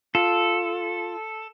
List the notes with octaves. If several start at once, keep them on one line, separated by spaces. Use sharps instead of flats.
F4 A4